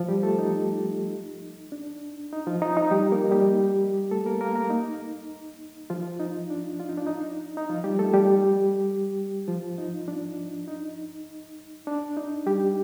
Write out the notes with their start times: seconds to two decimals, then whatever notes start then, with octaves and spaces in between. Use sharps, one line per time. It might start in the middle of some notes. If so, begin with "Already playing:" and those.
Already playing: F3 F4
0.08 G3 G4
0.23 A3 A4
0.39 D#4
1.72 D4
2.33 D#4
2.47 F3 F4
2.62 D#4
2.77 D#4
2.91 G3 G4
3.12 A#3 A#4
3.31 G3 G4
4.11 A3 A4
4.26 A#3 A#4
4.41 A#3 A#4
4.56 A#3 A#4
4.70 D#4
5.90 F3 F4
6.20 D#4
6.50 D4
6.80 F4
6.89 D#4
6.98 D4
7.07 D#4
7.57 D#4
7.69 F3 F4
7.84 G3 G4
7.99 A3 A4
8.14 G3 G4
9.48 F3 F4
9.78 D#4
10.08 D4
10.68 D#4
11.87 D4
12.17 D#4
12.46 G3 G4